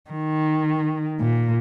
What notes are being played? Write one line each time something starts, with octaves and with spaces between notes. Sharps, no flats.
D#3
A#2